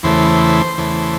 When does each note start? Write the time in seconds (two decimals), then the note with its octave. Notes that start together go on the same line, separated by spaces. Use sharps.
0.03 E2 C#3 E3 A3 C5
0.78 E2 C#3 E3 A3